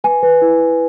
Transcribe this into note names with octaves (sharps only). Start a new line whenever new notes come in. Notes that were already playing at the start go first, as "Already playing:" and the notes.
B4 G#5
B4
E4
E4